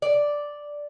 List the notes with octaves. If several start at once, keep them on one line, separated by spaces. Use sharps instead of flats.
D5